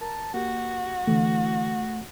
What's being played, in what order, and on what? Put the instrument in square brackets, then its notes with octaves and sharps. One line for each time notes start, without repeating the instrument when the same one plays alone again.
[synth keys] A#4 A#5 [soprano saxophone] A5
[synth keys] A#3 G4 [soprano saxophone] F#4
[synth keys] D3 E3 [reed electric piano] A3